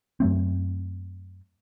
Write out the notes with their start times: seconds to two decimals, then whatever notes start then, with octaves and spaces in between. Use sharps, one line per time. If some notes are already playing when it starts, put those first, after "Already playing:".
0.20 F#2 F#3 A3 C4